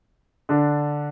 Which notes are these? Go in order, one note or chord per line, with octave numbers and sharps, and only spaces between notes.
D3 D4